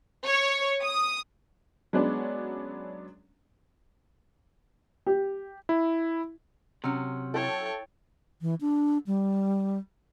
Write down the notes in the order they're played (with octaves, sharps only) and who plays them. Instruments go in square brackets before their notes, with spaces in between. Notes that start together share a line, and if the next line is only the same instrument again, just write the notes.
[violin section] C#5
D#6
[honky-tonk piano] F#3 G#3 B3 C#4 D4
[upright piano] G4
[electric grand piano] E4
[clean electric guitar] C3 [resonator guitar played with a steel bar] F#3 C#4
[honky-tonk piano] E4 A4 [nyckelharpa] C#5 G5
[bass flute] E3
D4
G3